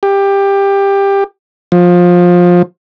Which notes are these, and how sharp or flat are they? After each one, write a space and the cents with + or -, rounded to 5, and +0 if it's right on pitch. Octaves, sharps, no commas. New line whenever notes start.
G4 +15
F3 +20